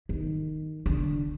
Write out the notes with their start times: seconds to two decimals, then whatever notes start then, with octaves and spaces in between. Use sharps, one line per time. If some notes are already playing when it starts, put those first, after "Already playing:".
0.09 D#3
0.86 D3